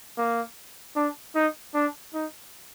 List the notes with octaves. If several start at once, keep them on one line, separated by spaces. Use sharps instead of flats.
A#3
D4
D#4
D4
D#4